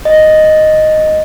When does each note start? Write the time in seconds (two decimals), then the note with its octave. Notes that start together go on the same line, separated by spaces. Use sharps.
0.05 D#5